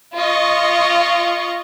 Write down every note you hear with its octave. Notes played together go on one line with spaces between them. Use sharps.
F4 D#5 C#6